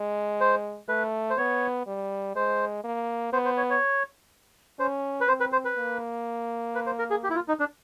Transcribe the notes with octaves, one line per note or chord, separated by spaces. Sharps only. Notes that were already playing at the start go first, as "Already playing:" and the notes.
Already playing: G#3
C5
A3 B4
C5
B3 C#5
G3
G#3 C5
A#3
B3 C5
C5
C#5
C#5
C#4 C5
B4
C4 C5
B4
C5
B4
A#3
B4
C5
A#4
G#4
G4
E4
F4
D#4
D4